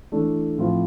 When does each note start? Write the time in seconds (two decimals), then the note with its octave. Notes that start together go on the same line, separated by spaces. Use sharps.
0.12 E3 A3 D4
0.58 A2 F3 C4 F4